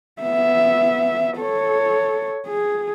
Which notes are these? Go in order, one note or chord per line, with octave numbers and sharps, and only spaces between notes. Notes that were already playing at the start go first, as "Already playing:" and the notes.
B3 E5
A4 C#5
G#4